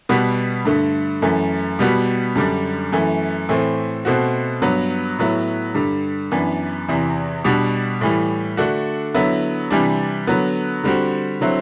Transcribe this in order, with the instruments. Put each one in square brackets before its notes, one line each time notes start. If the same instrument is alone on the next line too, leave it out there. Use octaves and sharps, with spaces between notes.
[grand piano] B2 G3 B3 F#4
G2 D3 A3
F#2 E3 A3
B2 G3 B3 F#4
F#2 D3 G3 D4
F#2 E3 A3
A2 E3 A3 C4
B2 A3 C4 F#4
G2 F#3 B3
A2 F#3 B3 E4
G2 D3 G3
F#2 E3 B3 D4
E2 C3 E3
B2 G3 D4 F#4
A2 E3 G3
D3 A3 D4 F#4
D3 F#3 B3 E4
C3 E3 G3 D4
D3 F#3 B3
D3 G3 C4 F#4
D3 F#3 C4 E4